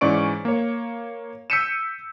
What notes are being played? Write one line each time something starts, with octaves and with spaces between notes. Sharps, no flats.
G#2 E3 C#4 D5 C#6 D7
A#3 C#5
E6 G6 B6 C#7 D#7 E7